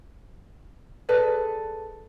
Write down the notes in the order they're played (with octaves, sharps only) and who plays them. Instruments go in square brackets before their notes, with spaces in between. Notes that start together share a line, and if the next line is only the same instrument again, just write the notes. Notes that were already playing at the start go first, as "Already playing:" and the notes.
[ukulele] G#4 A4 B4 D5